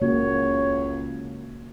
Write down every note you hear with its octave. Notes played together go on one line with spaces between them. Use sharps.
C#2 C#3 A#3 F#4 C#5